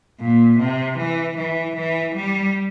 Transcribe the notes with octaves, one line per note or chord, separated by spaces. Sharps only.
A#2
C3
E3
E3
E3
G3